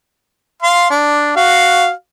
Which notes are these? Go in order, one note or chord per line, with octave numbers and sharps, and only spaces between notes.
F5 C6
D4
F#4 F5